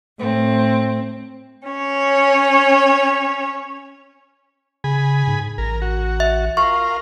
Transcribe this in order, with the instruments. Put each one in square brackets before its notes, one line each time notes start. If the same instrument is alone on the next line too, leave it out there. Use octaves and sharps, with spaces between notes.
[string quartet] A2 C4
C#4 C#5
[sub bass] C#3 [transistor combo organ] G#4 G#5 B5
[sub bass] G#2
[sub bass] A1 [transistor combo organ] A#4
[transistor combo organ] F#4
[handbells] E5
[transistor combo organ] F4 A#4 F5 [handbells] C#6